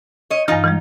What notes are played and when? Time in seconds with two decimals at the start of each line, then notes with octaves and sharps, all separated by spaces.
0.30 C#5 D#5
0.48 G2 E3 D#4 F4
0.64 E3 G3 G#3